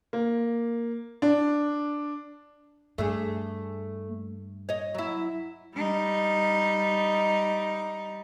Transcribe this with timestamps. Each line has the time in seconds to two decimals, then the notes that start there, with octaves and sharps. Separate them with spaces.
0.13 A#3
1.22 D4
2.98 G2 A3 D4 G#4
4.69 C#5 D#5
4.94 F#3 E4
5.75 G3 D#4